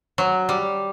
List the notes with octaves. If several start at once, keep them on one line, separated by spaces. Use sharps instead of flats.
F#3
G3